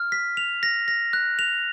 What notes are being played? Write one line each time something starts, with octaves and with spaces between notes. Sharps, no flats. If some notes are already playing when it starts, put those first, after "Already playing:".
Already playing: F6
B6
F7
A#6
A#6
F#6
F7